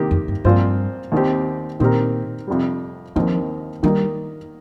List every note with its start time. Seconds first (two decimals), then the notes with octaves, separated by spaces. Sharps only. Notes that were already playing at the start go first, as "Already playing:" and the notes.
Already playing: C3 D#3 A#3 G4
0.11 F2
0.28 G2
0.45 G2 A#2 F3 C4 F4 C5
1.12 D#2 D#3 C4 G4
1.80 A#2 D#3 C4 G4 A#4
2.47 F2 C3 G3
3.16 D#2 D#3 F3 C4 D#4 A#4
3.83 D#3 G3 A#3 D#4 A#4